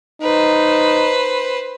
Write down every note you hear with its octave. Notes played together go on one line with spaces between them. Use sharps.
D#4 B4 C5